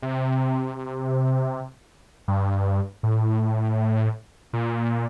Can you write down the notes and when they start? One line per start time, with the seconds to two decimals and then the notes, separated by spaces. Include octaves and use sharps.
0.02 C3
2.28 G2
3.03 A2
4.53 A#2